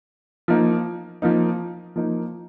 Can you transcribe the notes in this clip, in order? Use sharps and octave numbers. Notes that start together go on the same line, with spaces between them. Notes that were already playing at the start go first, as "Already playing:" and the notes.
F3 A#3 D#4
F3 A#3 D#4
F3 A#3 D#4